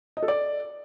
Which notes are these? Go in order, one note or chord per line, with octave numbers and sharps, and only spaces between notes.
D#5
A4
D5